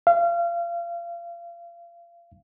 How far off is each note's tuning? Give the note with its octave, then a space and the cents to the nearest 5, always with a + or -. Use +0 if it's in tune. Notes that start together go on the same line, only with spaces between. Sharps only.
F5 -30